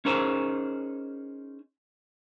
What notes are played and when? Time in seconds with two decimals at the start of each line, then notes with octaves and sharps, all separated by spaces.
0.05 C#4 D#4 G#4 A#4 C5 C#5